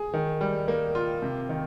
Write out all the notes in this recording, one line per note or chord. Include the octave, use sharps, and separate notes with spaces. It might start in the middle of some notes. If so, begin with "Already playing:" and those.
Already playing: G#4
D#3
G3
A#3
F4
C3
D#3